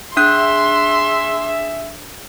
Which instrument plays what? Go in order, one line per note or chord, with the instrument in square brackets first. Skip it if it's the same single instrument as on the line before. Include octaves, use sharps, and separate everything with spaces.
[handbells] D4 F#6 [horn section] G#4 E5 [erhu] C6